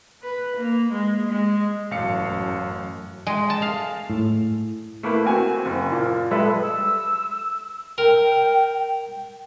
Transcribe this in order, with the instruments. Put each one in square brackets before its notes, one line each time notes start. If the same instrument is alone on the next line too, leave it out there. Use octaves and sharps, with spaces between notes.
[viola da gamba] B4
A#3
G#3
G#3
[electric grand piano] A1 F5 C#7 [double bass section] F#2 A2
[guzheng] G#3
A5
F5
[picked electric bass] A2
[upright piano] A3 A#3 E4 B4
A#3 C4 F#4 G#5
F#1
A#2
G3 G#3 A4 B4 E5
[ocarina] E6
[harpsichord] A#4 [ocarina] G5